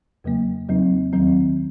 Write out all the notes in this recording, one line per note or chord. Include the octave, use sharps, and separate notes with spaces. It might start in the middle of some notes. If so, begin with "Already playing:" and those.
F2 C#3 F#3 A#3
F2 C#3 F#3 C4 D#4
D#2 D#3 F#3 C4